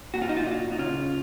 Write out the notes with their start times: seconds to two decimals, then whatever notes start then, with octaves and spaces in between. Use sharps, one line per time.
0.14 A#2 F#4
0.22 F4
0.29 D#4
0.37 F4
0.46 A#2 F#4
0.72 D#4
0.78 C#3 F4